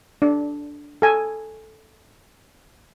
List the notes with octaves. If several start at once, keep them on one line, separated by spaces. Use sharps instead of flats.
D4
A4 G#5